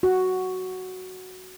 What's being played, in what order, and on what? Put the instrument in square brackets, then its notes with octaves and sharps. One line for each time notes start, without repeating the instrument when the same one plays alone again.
[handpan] F#4